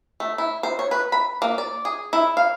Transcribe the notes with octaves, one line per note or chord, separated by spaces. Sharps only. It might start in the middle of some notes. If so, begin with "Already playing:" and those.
A3
E4
C5
C#5
B4
B5
A#3
D5
G#4
E4
F5